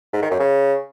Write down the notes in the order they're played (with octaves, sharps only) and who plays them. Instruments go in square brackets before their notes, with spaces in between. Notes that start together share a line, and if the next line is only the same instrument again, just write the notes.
[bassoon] G#2
D#3
F#2
C#3